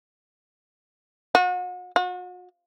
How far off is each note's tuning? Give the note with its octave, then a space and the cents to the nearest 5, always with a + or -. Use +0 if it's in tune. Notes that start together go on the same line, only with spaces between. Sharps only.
F#4 -40
F#4 -40